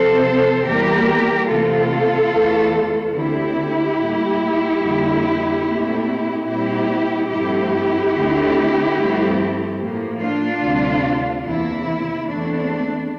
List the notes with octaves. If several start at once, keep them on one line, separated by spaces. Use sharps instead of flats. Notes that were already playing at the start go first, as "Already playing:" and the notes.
Already playing: C3 F3 C4 A4 C5
E2 E3 G3 A#3 G4 A#4
C3 E3 A3 C4 F4 A4
E2 E3 A3
D2 D3 A3 C4 E4 G4
A2 G3 A#3
F2 D3 G3 A#3
A#2 A3 C4
A#2 G3 C4 E4 G4
G2 F3 A3 C4 E4 G4
D2 D3 A3 C4
G2 F3 A3 C4
A2 F3 A#3
D4 F4
D2 C3 G3 C4
E2 C3 E3 A#3 E4
E2 E3 A3 C4 D4